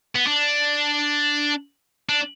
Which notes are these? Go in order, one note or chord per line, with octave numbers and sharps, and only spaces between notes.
B3
D4
D4